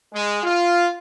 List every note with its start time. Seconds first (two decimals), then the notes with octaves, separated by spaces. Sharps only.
0.13 G#3
0.43 F4